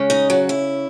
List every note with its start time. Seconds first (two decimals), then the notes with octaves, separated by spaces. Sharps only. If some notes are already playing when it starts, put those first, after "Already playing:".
Already playing: C#3 G#3 C#4
0.10 D#4 D#5
0.30 F#3 F#4
0.49 E4